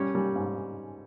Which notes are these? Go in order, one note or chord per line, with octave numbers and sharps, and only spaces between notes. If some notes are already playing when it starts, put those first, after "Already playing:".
Already playing: G3 C#4
G3
G#2